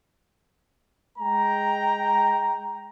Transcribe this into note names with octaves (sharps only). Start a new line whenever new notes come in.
G#3 G5 A#5